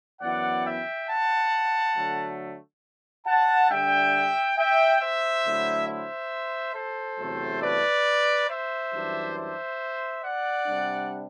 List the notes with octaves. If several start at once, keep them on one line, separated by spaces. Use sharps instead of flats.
F#2 E3 B3 E4 D5 F#5
E5 G5
F#5 A5
D3 F#3 A3
F#5 A5
D3 G3 D4 E5 G5
E5 G5
C5 E5
D3 F#3 A3 E4
C5 E5
A4 C5
E2 C3 F#3 A3
B4 D5
C5 E5
F#2 E3 G3 D4
C5 E5
D5 F#5
C3 G3 D4